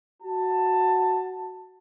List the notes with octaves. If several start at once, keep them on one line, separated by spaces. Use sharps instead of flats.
F#4 A5